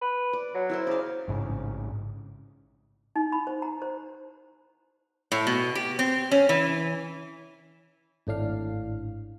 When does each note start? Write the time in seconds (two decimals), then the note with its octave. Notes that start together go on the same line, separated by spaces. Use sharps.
0.02 B4
0.33 D5
0.54 F#3
0.70 E4 A#4 C5
0.87 C#3 D5 F5
1.28 A1 G#2 C#3
3.16 D#4
3.32 B5
3.47 C5
3.62 A#5
3.82 C5
5.32 A2
5.47 B2
5.75 G4
5.99 C4
6.31 C#4
6.49 E3
8.27 G#1 A2 D4 F5